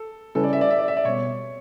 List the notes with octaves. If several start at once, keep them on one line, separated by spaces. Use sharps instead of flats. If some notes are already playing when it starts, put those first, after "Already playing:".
Already playing: A4
C#3 G3 C#4 E4 A4 B4
D5
E5
D5
E5
D5
E5
D5
B2 G3 B3 C#5